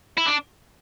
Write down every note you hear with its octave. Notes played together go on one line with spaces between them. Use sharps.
E4
D4